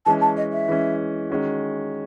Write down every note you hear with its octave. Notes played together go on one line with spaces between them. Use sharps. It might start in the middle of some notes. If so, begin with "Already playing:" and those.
E3 G#3 C#4 A5
A5
D#5
E5
E3 G#3 C#4
D#3 G#3 C#4 F#4